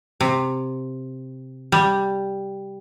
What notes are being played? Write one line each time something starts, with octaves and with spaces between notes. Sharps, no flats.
C3
G3